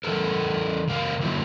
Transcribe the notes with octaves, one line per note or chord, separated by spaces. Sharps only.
E3 E4 A4 A#4
C#3 E3 A#4 F5
D3 F#3 A#3 E4